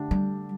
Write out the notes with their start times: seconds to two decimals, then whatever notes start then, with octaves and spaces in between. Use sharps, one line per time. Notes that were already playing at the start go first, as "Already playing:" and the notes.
Already playing: D3 A3 D4 G4
0.11 G3